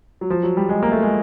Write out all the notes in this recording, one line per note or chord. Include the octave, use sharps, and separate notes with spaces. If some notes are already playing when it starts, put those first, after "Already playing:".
F#3
F3
F#3
G3
G#3
A#3
A3
G#3